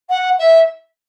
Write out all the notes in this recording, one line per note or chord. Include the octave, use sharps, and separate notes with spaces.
F#5
E5